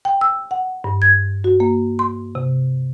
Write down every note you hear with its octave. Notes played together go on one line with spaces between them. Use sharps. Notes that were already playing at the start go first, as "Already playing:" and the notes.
G5
E6
F#5
G2
G#6
F#4
A#3
C6
C3